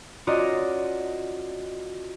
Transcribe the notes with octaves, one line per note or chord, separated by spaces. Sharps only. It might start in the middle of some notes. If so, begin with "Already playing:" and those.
C#4 F4 F#4 A#4 D5 D#5